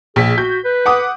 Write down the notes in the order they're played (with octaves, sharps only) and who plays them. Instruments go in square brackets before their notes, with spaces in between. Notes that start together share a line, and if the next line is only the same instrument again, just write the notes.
[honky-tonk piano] A#1 B6 [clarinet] G#4
[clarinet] F#4 [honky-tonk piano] G6
[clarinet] B4
[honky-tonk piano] F#5 D6 D#6